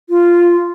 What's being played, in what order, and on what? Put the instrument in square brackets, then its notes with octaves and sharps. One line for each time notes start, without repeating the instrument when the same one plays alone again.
[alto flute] F4